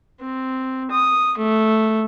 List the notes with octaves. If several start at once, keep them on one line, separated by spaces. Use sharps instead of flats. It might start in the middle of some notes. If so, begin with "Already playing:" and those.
C4
D#6
A3